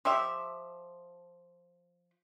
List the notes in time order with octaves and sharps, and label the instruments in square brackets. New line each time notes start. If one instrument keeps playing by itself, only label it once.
[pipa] F3 G4 E5